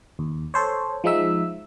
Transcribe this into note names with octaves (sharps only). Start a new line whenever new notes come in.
D#2
A4 C5 C#5
F3 G#3 D#4 E5 E6